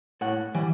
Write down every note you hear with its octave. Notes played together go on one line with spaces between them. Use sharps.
A2 F#5
E3 G3